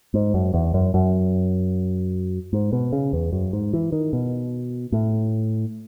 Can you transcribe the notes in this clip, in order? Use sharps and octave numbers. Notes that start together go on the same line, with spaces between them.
G#2
F#2
E2
F#2
F#2
G#2
B2
C#3
E2
F#2
G#2
E3
D#3
B2
A2